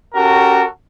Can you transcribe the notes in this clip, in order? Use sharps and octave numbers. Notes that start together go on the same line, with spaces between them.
C#4 F#4 G4 A4 A#4